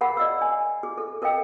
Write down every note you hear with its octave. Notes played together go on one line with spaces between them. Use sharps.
G#4 A#4 F5 F#5 B5
D5 D#5 E6
G#5
G#4
A4
A4 A#4 D#5 F5 G5